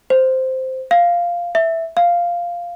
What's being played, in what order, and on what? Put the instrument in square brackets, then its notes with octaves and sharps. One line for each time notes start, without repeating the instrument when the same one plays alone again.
[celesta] C5
F5
E5
F5